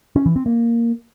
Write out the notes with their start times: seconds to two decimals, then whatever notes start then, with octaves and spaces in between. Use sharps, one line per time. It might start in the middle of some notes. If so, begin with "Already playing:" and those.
0.16 C#4
0.26 E3
0.36 C4
0.46 A#3